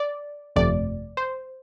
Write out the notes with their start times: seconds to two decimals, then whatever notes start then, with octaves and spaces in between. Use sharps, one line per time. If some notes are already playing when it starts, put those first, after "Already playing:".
Already playing: D5
0.56 G1 F2 C3 F3 A3 D5
1.17 C5